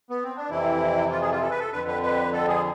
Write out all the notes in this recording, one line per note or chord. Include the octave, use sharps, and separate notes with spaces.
B3
C4
D4
F2 C3 E3 E4
F4
G#4
F4
A4
B4
A4
F2 D3 B4
B4
B4
A4
G#4